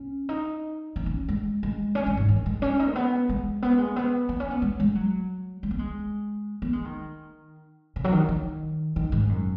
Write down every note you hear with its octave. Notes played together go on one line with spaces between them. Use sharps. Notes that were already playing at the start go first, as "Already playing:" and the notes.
Already playing: C#4
D#4
C#4
C#4
G#3
G#3
C#4
G#3
G#2
D#3
G#3
C#4
D#4
G#3
B3
G#3
B3
G#3
B3
B3
C#4
B3
G#3
G#3
F#3
G#3
B3
G#3
B3
G#3
D#3
C#3
F#3
D#3
D#3
D#3
G#2
F#2